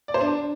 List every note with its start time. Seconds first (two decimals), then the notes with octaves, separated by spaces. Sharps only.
0.08 D5
0.14 C5
0.21 D4